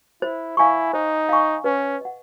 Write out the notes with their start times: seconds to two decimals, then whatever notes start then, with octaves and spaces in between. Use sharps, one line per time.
0.22 E4 C5
0.57 E4 F5 G#5 C#6
0.93 D#4 C5
1.29 F5 G#5 C#6
1.64 C#4 B4
2.01 D#5 F#5